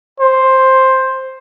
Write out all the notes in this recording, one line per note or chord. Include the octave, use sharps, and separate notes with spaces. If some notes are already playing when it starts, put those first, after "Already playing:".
C5